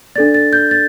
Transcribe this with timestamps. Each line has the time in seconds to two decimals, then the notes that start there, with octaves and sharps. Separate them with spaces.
0.16 D4 A4 D5 A6
0.34 A6
0.53 G6
0.71 A6